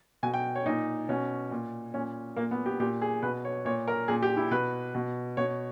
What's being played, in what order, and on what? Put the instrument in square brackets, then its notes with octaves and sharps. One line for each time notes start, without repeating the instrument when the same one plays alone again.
[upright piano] B2 G#5
G5
C#5
A#2 D#4
B2 C#4
A#2
A#2 C#4
A#2 A#3
B3
G4
A#2 G4
G#4
B2 B4
C#5
A#2 C#5
A#4
A#2 G#4
G4
E4
B2 B4
B2
B2 C#5